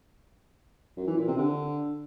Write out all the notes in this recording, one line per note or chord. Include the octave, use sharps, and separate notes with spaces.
F#2
E3
A#2
C3
D3